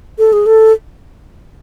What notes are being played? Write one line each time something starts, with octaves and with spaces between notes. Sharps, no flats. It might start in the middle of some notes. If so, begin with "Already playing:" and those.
A4
G#4
A4